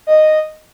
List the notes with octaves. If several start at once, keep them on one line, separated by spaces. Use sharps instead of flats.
D#5